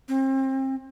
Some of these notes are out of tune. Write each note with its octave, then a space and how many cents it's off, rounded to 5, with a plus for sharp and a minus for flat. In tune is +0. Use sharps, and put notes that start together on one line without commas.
C4 +35